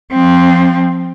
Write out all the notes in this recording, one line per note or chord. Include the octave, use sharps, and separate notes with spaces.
F3 C4